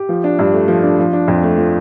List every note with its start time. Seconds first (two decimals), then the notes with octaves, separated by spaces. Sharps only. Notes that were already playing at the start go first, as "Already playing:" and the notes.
Already playing: G4
0.09 F3
0.24 D4
0.39 G2
0.54 A3
0.68 F3
0.83 D4
0.99 F3
1.13 D4
1.28 F2
1.43 A3
1.58 F3